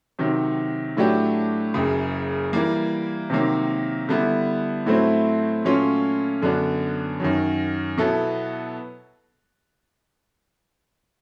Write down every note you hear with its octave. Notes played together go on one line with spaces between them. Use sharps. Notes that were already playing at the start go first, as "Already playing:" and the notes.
C3 D#3 F#3
A2 F#3 A3 D4 G4
F#1 F#2 C#3
E3 G3 A#3
C3 D#3 F#3 A#3
D3 G3 B3 E4
A2 F#3 A3 C4 E4
A#2 F#3 A3 C#4 F4
F#2 D3 F#3 B3 D4
F#2 D#3 F#3
B2 F#3 B3 E4 A4